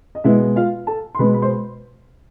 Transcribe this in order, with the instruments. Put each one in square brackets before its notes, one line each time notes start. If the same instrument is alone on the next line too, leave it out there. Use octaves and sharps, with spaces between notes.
[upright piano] D#5
B2 G#3 B3 E4 E5
F4 F5
A4 A5
C6
B2 G#3 B3 B4 B5
B5
C5 C6